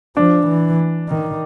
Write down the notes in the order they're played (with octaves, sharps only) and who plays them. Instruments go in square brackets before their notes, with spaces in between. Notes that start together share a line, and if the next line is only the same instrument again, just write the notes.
[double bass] F3 [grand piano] D4
[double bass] E3
D#3